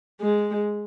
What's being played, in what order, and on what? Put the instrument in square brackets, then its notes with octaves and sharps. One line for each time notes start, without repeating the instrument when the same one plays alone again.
[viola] G#3